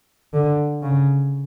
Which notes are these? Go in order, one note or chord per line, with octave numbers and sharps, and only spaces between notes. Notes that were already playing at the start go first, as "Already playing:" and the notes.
D3
C#3